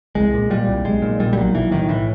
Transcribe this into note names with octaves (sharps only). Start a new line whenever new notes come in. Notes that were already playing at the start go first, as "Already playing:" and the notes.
C2 G#3
A#2
A#2 G3
C2
B1 G#3
A#2
A#2 G3
G3
B1 F#3
B1 E3
A2 D#3
A2 E3